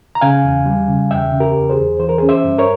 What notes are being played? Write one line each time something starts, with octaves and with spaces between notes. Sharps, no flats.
A#5
C#3 F5 G#5
E2
G3
C#3
E2 E5 G5
C#3
G4 A#4
E2
G#4 C5
E2
E3 C5
A#4
C#4 G#4 C5
C5 E5
G2
A#4 C#5